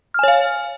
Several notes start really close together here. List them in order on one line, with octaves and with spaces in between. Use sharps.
F6 G#5 C#5 F5